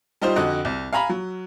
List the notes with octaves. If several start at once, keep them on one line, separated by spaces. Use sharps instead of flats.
G3 D#4 F4 C5
F2 D3 F#4 D#5
C2
F5 G#5 A#5 B5
F#3